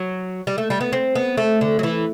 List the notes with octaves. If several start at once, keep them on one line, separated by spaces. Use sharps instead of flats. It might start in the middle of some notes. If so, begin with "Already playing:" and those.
Already playing: F#3
G3
A3
G3
B3
C4
B3
A3
D3
F#3
E3